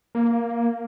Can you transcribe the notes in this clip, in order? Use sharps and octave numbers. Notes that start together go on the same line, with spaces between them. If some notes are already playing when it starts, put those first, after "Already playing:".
A#3